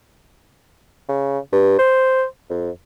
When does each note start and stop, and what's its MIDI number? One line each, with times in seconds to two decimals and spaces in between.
1.09 1.39 49
1.52 1.78 43
1.79 2.25 72
2.50 2.70 41